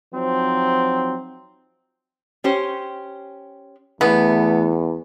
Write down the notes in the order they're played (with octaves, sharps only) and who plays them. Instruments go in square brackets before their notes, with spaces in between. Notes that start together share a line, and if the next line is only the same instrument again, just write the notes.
[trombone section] F3 F#3 C4 D#4
[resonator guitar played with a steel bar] C#4 G4 C5
[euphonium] E2 [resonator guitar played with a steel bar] E3 E4 [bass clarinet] A3 [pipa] B3